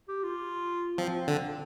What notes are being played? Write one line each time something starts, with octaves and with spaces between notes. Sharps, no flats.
G4
F4
F3 C4
D3